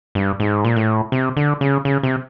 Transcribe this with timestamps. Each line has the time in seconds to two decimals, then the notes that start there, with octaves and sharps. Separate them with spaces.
0.15 G2
0.40 G#2
0.65 A#2
0.76 A2
1.12 C3
1.37 D3
1.61 C#3
1.85 C#3
2.03 C3